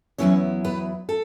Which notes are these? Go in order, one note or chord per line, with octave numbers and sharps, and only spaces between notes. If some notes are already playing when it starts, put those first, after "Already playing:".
E2 C#3 F#3 B3 C#4 E4 C#5
B3 B4
A4